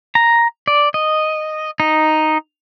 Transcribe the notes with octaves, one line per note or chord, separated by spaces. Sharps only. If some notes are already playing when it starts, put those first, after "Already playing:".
A#5
D5
D#5
D#4